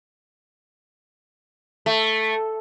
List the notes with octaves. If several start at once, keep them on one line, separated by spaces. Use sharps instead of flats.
A3